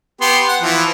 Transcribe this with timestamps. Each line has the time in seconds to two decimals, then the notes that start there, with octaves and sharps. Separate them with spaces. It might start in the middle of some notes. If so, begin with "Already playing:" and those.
0.21 B3 G4 C6
0.48 F#5
0.62 E3 F3